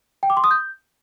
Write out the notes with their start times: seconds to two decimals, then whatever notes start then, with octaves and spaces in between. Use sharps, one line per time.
0.23 G5
0.30 D6
0.37 C6
0.44 D#6
0.51 G6